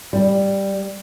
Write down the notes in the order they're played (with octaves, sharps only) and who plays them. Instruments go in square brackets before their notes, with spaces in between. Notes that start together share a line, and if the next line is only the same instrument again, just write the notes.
[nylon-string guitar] G3